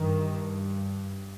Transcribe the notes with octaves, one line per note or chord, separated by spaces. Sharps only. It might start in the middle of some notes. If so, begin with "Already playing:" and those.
Already playing: G2 D#3